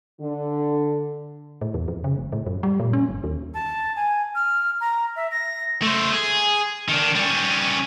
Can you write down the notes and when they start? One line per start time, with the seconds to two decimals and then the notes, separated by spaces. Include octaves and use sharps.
0.21 D3
1.61 A2
1.74 E2
1.88 F2
2.04 C#3
2.18 F1
2.32 A2
2.47 F#2
2.63 G3
2.80 A#2
2.93 C#4
3.09 G1
3.24 D#2
3.54 A5
3.95 G#5
4.35 F6
4.80 A#5
5.15 E5
5.31 A#6
5.82 A3 C5
6.12 G#4
6.88 D#3 D4
7.15 G3 C#4